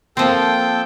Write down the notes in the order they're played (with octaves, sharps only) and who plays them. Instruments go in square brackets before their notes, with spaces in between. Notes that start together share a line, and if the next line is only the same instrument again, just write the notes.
[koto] F3 C4 [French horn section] A#3 [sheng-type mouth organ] A4 G5